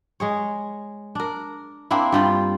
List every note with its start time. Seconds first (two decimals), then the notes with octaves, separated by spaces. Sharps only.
0.20 G#3 G#4 C#5
1.15 D4 A#4
1.91 A#3 C4 D4 E4
2.12 G2 G3 F4